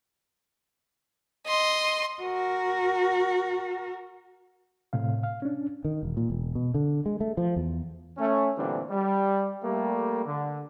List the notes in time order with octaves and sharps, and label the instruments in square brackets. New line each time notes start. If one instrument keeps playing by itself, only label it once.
[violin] D#5 C6
[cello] F#4 A#4
[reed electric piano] A2 C3 F5
F5
C#4 D4
[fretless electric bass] D#3
E1
A#2
E1
B2
D3
G#3
A3
F3
E2
[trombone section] A3 C#4
A#2 D3 E3 G3 C4 D4
G3
G3 A3 A#3
D3